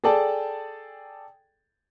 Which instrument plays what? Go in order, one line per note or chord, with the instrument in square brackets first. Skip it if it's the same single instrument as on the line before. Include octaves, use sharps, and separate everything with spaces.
[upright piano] G#4 A4 D5 G5 A5